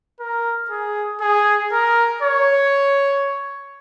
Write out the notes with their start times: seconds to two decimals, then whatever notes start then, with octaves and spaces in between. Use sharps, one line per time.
0.20 A#4
0.71 G#4
1.21 G#4
1.72 A#4
2.22 C#5